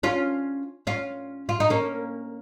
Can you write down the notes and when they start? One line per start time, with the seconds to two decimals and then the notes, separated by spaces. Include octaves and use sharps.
0.03 C#4 F4
0.87 C#4 F4
1.49 F4
1.60 D#4
1.70 A#3 C#4